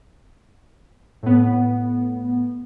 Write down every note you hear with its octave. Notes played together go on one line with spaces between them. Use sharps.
A2 B3